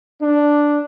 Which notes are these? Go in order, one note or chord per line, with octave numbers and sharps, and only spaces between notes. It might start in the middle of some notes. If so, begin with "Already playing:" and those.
D4